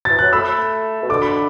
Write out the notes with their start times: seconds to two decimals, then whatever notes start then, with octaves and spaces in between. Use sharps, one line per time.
0.05 E3 A6
0.19 F#3 F#6
0.33 A3 B5 E6
1.02 B2
1.09 D3 D6
1.22 B5